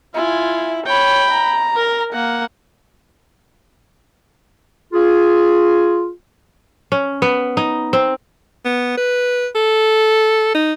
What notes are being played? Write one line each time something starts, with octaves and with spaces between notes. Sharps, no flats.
E4 F4 G#5
C#5 G5 B5
A#5
A#4
A#3 F#5
F4 G#4
C#4
B3
D#4
C4
B3
B4
A4
D#4